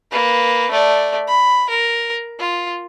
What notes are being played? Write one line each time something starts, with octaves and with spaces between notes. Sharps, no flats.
A#3 B4
A3 D5
B5
A#4
F4